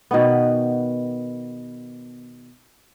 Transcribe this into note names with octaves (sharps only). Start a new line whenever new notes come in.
B2 D#3 B3